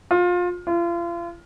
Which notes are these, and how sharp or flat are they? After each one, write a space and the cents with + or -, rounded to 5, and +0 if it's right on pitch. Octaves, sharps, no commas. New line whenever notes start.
F4 +25
F4 -35